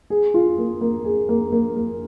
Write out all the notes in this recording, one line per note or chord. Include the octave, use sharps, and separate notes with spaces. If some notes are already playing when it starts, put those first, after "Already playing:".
G#4
F4
A#3
A#3
G#4
A#3
A#3
A#3